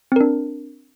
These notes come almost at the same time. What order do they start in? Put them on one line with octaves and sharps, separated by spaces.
C4 A#4 D4